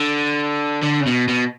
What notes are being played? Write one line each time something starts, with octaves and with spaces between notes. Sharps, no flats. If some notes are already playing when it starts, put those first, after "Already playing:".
Already playing: D3
D3
C#3
B2
B2